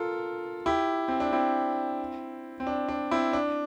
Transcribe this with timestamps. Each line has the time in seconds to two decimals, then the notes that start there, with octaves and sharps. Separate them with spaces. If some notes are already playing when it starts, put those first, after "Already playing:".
Already playing: F4 A4 A#4
0.66 E4 G4
1.08 C4
1.20 D4
1.33 C4 E4
2.60 C4
2.67 D4
2.89 D4
3.11 C4 E4
3.33 D4